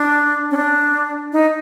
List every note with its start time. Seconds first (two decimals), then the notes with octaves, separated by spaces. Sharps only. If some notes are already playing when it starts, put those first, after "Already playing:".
Already playing: D4
0.51 C#4
0.57 D4
1.33 D#4